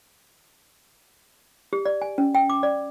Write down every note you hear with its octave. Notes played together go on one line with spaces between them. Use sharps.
G4
D5
G#5
C#4
G5
D6
D5